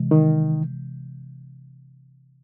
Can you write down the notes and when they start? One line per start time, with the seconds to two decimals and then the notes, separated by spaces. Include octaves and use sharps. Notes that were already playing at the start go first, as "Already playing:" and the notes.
Already playing: C3 E3 G#3
0.11 D#3